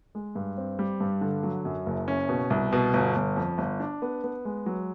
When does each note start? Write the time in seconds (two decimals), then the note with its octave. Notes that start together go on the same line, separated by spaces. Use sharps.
0.15 G#3
0.35 G2
0.58 C4
0.79 G3
1.00 G2
1.21 D3
1.43 F#3
1.65 F#2
1.86 F#1
2.08 C#4
2.29 B2
2.50 C2
2.73 B2
2.94 G1
3.16 G1
3.36 F2
3.58 G1
3.80 D4
4.02 B3
4.24 B3
4.45 G#3
4.66 F#3